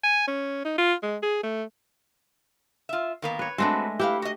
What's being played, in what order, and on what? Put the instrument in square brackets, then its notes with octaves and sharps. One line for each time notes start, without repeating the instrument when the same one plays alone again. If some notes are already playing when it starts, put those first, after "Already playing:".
[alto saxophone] G#5
C#4
D#4
F4
G#3
G#4
A3
[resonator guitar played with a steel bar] F4 E5
D#3 A#3 B3
[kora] B4 C#5
[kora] G#3 A3 D4 [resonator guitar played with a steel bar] C4 F#4 B4
[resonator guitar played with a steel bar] E4 B4 F5 [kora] G4
[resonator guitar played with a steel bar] F#4 D#5